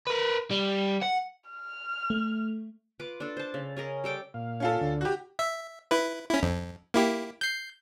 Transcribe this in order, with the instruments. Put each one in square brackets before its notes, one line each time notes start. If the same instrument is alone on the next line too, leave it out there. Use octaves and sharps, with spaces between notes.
[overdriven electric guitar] A#4 B4
G3
F#5
[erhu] F6
[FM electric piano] A3
[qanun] F4 B4 D6
D4 A4
C5 A5
C#3
C#4 G#4 A#4 D#5
G3 A4 G5 D6
[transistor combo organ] A#2 F5
[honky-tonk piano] C#4 F4 A4
[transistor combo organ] D2 D3
[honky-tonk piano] F#4 G4
[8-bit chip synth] E5
E4 B4
C#4 E4
F2
A#3 E4 G4
G6 C7